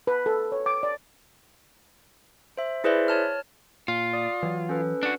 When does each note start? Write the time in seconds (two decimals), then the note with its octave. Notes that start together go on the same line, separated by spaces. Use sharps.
0.07 B4
0.26 A4
0.52 C#5
0.66 D6
0.83 D5
2.57 C5 E5
2.84 E4 G#4 B4 C5 D5 E5
3.08 C#5 A5 F6
3.88 A#2 F4
4.13 D5 D#6
4.43 E3 F#3
4.69 C#4 A4 B4
5.03 D4 F#4